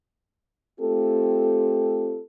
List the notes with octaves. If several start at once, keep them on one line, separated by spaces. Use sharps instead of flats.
A3 C4 F4 G4 A4